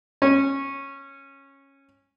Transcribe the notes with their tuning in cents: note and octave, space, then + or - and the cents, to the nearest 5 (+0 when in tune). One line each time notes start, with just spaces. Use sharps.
C#4 -15 C#5 -15